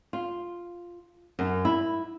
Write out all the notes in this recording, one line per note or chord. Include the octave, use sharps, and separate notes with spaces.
F4
F#2
E4